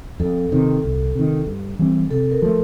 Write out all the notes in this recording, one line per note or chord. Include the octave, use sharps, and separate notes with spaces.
F2 A4
C3 D#3
C2
C3 D#3
G2
E3 G3 C4
C3 A4
A#4
F3 A3